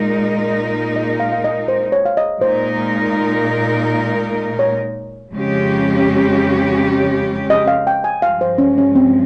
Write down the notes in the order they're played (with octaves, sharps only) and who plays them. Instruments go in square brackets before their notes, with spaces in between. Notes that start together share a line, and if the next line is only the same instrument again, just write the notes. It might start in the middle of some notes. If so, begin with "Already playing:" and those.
Already playing: [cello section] A#2 G#3 D#4 A#4
[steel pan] D#5
F5
F5
D#5
C5
C#5
F5
D#5
[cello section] A#2 G#3 D#4 A#4 [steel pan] C5
[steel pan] C#5
[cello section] F2 C#3 G#3 C#4 G4
[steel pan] D#5
F5
G5
G#5
[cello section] G2 F3 G#3 [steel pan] F5
[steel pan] C5
C#4
C#4
C4